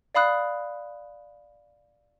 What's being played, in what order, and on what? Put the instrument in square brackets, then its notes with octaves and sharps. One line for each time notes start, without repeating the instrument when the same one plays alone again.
[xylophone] D5 F5 B5 D#6 F#6